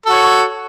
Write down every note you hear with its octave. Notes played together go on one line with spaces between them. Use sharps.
F#4 A4 C#5